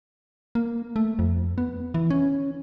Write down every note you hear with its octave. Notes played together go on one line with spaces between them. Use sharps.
A#3
A3
F2
B3
E3
C#4